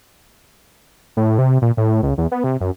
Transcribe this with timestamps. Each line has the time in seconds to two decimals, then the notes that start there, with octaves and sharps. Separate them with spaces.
1.17 A2
1.38 C3
1.62 A#2
1.77 A2
2.03 C#2
2.18 E2
2.32 B3
2.44 C3
2.60 F#2